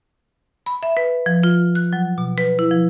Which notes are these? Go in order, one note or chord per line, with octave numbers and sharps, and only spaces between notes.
B5
E5
B4
F3
F4
F#6
F#3
B2
B4
E4
F3